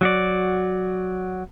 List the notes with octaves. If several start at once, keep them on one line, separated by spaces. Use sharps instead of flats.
F#3 F#4 D5